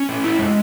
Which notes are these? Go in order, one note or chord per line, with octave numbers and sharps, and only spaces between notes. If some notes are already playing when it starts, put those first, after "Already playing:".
Already playing: C#4
A3
E4
G#3